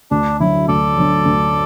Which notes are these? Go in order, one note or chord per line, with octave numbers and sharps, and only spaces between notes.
D2 D4
D3 F#3 E4
D2 A4 D5
D3 F#3
D2